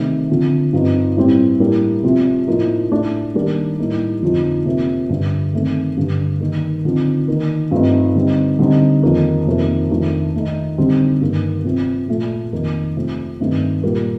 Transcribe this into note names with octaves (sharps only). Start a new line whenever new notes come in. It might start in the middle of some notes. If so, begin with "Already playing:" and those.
Already playing: C3 D#3 A3 D#4
D3 F3 C4
G2 F3 C4 D#4
A2 G3 C4
A2 G3 A#3 D4
C3 F3 C4
A2 F3 A#3 D#4
A2 A3 D4
D#3 G3 A#3 D4
A2 G3 A#3 D#4
F2 D3 F3 C4 D#4
C3 F3 A#3
G2 D3 G3 D4
D#3 A3 C4
G2 D3 G3
D#3 A#3 D#4
D3 F3 C4 D#4
D#3 A#3 D#4
G2 F3 A3 C4 D#4
D3 G3 C4 D#4
D3 G3 C4 D#4
F2 D#3 A#3 D#4
F2 C3 D#3 A#3
F2 D#3 A3 D4
D#3 A3 D#4
D3 G3 C4 D#4
G2 D#3 A#3
C3 F3 C4
A#2 F3 A3
F2 D#3 A#3 D#4
C3 F3 A3 C4
G2 D#3 A3 C4 D#4
A#2 G3 A#3